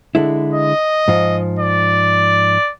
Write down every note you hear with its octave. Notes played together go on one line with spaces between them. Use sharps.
D3 G#3 E4
D#5
G#2 F3
D5